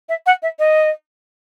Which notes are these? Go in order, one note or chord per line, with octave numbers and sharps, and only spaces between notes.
E5
F#5
E5
D#5